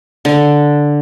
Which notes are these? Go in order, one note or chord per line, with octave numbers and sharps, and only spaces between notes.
D3